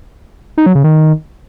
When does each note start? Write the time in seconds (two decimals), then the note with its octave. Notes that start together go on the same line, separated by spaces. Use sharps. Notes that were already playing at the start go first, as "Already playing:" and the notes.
0.58 D#4
0.66 F#3
0.75 C#3
0.84 D#3